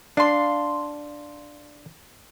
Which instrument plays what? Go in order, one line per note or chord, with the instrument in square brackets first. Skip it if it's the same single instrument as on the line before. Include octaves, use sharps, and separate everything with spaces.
[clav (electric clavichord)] D4 [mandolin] F5 A5 C6